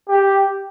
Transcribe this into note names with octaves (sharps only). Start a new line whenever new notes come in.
G4